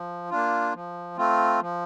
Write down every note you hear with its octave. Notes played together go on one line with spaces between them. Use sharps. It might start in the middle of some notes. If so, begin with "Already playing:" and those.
Already playing: F3
A#3 D4 F4
F3
A3 C4 F4
F3